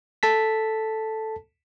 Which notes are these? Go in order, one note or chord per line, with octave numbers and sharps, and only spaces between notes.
A4 A5 B6